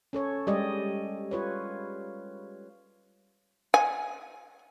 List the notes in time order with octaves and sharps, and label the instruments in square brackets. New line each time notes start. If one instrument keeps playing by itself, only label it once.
[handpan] C#4 A4 C#5
G3 G#3 G4 D5 D#5
F4 B4 C#5
[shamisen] G#5